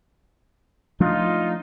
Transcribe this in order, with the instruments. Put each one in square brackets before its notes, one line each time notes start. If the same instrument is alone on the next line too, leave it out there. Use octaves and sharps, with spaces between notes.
[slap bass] F3 A3 D4 [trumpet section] D#4 F4